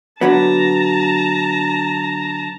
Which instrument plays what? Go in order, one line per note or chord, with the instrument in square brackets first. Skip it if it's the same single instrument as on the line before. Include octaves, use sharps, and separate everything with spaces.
[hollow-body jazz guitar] D3 F#3 B3 [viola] A5 A#5